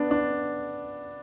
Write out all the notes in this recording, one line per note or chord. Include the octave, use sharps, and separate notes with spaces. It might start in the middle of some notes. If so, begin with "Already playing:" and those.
Already playing: B3 D4
D4